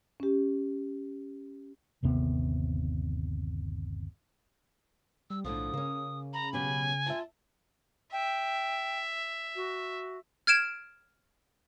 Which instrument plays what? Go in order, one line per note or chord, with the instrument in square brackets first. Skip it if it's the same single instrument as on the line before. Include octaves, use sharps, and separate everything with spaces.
[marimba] C#4 G4
[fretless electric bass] G1 D#2 C3 B3
[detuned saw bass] G3 [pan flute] E6
[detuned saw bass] B1 [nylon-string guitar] A2 D3 F3 [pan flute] D#6
[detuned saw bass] C#3 [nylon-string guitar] A#3 C#4
[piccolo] A#5 [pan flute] B5
[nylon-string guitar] B2 F#3 G4 [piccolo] G#5
[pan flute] F4 [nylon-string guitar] E5 A5
[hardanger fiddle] E5 [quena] G5
[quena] F#4
[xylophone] F6 G#6 D7 E7